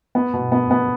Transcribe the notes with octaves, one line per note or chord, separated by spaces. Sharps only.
B3
B2
B3
B3